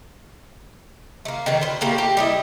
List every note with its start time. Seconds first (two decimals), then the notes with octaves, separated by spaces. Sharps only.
1.25 A3 A#3
1.46 B2 D3 D#3
1.61 B4 C5
1.81 A3 A#3 G4
1.98 G4
2.17 G3 E4 D#5